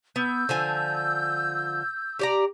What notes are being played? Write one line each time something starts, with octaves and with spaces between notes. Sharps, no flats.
B3 E6 G6
D3 F3 G#5
G4 D5 A#5